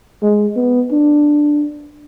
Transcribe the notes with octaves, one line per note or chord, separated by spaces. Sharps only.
G#3
B3
D4